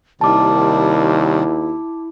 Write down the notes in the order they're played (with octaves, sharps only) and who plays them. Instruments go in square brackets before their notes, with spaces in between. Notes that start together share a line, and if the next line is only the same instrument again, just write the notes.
[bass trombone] D#2 [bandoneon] C3 D#3 G3 [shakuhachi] E4 [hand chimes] A5 D6